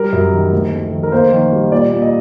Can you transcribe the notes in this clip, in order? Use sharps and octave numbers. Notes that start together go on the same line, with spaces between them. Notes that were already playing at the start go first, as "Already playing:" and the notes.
Already playing: G3 A#4
F#2
D#3
D2
A3
D#3
A#4
A#3 C5
D#3
G3
A#2 D5
A#2
D#5